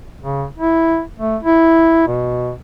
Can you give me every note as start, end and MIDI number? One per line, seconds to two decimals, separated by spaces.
0.21 0.45 49
0.58 1.01 64
1.19 1.37 57
1.43 2.07 64
2.07 2.52 47